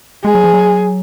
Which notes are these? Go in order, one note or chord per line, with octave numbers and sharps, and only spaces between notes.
G#3 G#4
F#3
F3
F#3